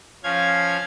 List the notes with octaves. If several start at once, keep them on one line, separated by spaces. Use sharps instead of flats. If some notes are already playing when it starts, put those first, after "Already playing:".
F3 C#4 F5 G#6